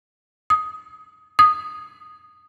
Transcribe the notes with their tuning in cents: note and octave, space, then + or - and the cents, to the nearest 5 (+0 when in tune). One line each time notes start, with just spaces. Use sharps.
D#6 +10
D#6 -10